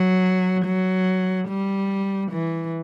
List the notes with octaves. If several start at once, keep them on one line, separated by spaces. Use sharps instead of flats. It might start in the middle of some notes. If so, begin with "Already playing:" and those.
Already playing: F#3
F#3
G3
E3